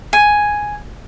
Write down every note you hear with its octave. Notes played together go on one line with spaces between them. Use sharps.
G#5